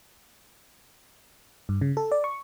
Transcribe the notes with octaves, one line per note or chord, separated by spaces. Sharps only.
G2
C#3
A4
D5
C#6